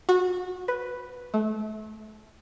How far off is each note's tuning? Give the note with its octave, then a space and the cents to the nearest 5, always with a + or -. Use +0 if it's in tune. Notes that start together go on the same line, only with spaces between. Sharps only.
F#4 -25
B4 +0
A3 -30